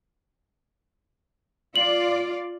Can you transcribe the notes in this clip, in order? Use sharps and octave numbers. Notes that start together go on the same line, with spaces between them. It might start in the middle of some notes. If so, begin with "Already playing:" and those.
F4 D5 F#7